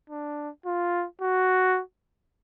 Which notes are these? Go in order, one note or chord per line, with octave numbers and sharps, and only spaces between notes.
D4
F4
F#4